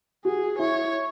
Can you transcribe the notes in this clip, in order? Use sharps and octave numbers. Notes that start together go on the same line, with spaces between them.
F#4 G#4
E4 C#5